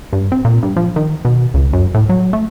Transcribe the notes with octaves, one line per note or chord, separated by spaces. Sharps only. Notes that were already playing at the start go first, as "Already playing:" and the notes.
G2
C4
A#2
G2
F3
D#3
B2
C#2
F#2
A2
F#3
A3